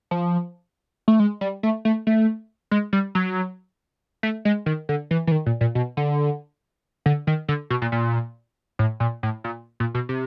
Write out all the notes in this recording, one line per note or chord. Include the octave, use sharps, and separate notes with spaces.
F3
A3
G#3
G3
A3
A3
A3
G#3
G3
F#3
A3
G#3
D#3
D3
E3
E3
D#3
A#2
A#2
B2
D3
D3
D#3
D3
B2
A#2
A#2
A2
A#2
A2
A#2
A#2
B2
C3